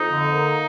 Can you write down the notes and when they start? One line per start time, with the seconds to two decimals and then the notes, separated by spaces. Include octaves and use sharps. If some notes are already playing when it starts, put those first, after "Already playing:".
Already playing: F2 D#4
0.11 D3
0.34 A#3